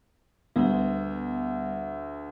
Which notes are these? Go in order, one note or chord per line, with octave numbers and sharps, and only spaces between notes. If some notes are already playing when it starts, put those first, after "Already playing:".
D2 G3 B3